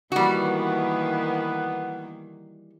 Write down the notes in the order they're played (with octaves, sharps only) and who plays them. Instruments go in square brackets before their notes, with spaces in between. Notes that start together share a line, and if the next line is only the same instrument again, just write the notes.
[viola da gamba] D#3 E3 A#3 [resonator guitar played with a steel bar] G3 F#4 [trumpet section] B3